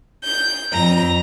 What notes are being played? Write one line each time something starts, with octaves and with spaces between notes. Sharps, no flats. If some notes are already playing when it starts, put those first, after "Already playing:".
G6
F2 A#5